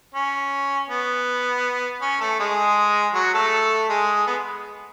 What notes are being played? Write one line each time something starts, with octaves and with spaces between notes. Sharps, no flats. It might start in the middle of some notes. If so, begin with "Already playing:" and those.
C#4
B3
C#4
A3 A4
G#3 G#4
F#3 F#4
A3 A4
G#3 G#4
B3